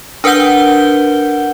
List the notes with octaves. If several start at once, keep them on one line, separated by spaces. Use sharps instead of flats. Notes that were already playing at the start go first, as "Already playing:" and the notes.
D4 A#4 B4 F#5 G6 G7